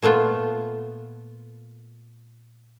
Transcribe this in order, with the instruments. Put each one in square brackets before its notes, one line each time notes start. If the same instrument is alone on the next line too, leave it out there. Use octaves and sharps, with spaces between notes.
[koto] A#2 A3 B3 F4